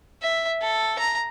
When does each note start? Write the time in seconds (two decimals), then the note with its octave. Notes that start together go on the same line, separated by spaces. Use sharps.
0.22 E5
0.62 A4
0.99 A#5